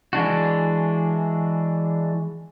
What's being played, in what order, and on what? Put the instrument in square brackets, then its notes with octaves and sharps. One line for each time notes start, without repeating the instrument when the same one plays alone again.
[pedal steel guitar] E3 G#3 D4 F#4